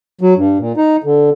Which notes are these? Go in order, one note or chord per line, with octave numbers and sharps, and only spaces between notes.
F#3
G2
A#2
D#4
D3